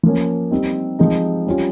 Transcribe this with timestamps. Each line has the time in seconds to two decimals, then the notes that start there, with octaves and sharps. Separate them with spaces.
0.03 F3 A#3 C#4
0.51 G3 C4 D#4
0.99 F3 G#3 C4 D#4
1.47 G3 C#4 F4